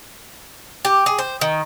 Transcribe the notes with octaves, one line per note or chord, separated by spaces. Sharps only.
G4
G#4
C5
D#3